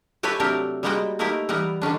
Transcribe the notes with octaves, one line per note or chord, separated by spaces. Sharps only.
G4 A4 B4 C#5 E5 G#5
C3 F#3 A3 D4 G4 A#4
G3 G#3 A#3 B3 F#4 G5
A3 A#3 D#4 E4 G4 A#4
E3 G3 B3 A#4
D3 D#3 C#4 D4